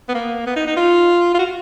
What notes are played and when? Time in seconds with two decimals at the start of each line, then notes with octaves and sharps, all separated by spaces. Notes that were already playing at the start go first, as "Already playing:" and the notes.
0.09 B3
0.15 A#3
0.47 B3
0.56 D#4
0.67 D#4
0.77 F4
1.35 F4
1.39 F#4